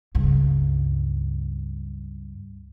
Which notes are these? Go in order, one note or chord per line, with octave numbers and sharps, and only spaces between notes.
C#2 G2